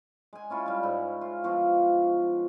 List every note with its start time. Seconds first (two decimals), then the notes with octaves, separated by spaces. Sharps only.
0.33 G#3 G#5
0.50 C#4 E4 F4 C#5
0.66 G3 E4
0.83 G#2
1.21 F4
1.44 B2 F3 F4 F#4